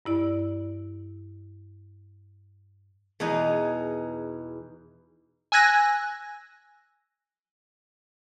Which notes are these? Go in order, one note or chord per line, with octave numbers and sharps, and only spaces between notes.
G2 E4 D5
E2 B2 D#4 G#4
G#5 E6 F#6 G#6 A#6